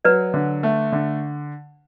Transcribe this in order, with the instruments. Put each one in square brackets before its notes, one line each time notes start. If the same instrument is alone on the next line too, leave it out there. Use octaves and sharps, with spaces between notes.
[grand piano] F#3 [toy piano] B4 D5
[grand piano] D3
A3
D3